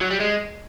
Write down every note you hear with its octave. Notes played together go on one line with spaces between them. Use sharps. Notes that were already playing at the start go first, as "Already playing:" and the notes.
F#3
G3
G#3